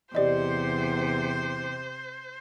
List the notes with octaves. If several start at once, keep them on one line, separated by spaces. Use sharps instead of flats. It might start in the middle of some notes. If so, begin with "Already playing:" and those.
E2 C3 G4 C5 D5 D#5